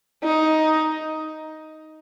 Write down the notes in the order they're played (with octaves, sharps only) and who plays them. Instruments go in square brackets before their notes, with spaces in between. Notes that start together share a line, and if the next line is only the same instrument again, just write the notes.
[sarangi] D#4